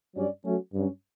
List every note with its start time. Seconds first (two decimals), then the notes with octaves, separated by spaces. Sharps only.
0.15 G2 F#3 C#4 G4 D5
0.45 F#3 A3 C#4 F#4 A4
0.74 G2 F#3 C#4